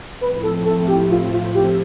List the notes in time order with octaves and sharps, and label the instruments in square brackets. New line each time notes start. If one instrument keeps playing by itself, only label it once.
[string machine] A2 F3 A3 C4 E4 [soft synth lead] B4
[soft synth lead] A4
A4
G4
F4
F4
G4